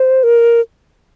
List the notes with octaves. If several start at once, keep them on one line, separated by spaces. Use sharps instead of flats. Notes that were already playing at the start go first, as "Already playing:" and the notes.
Already playing: C5
A#4